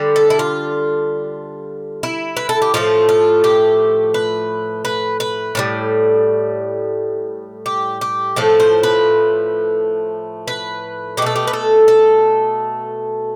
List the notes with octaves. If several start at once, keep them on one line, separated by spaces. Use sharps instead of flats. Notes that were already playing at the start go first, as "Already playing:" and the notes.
Already playing: D3 G3
A4
E4
F4
E4
B4
A4
G4
A2 F3 A3 F4
F4
G4
B4
B4
B4
A2 E3 G3
G4
G4
A2 F3 A3 A4
C5
B4
B4
B2 A3 G4 A4
G4
B4
A4
A4